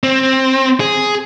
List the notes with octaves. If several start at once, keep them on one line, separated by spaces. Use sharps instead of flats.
C4
G#4